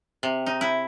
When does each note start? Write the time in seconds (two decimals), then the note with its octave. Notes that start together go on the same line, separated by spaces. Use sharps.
0.23 C3
0.46 D#4
0.61 E4